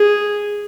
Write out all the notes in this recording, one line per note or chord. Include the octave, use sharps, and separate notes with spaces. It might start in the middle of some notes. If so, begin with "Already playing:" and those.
Already playing: G#4